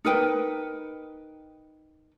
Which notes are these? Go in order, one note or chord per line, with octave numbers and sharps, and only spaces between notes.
D#4 A#4 B4 G5